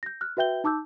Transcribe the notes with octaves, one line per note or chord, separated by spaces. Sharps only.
G6 A#6
F6 F#6
F#4 B4 E5 G5 G6 G7
D#4 A5 D6 E6 G6